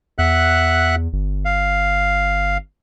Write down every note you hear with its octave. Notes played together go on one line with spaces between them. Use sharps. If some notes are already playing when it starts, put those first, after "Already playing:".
E2 E5 F#5 F#6
G1
F5